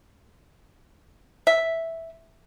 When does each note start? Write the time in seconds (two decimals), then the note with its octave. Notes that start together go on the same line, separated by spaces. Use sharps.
1.47 E5